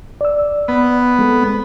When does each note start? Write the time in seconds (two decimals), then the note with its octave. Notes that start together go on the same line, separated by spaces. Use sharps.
0.21 D5 E6
0.68 B3
1.19 G#3 C4 A4